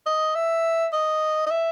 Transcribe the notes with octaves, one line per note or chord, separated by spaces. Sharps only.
D#5
E5
D#5
D#5
E5